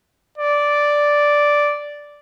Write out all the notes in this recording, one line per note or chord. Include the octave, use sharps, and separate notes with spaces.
D5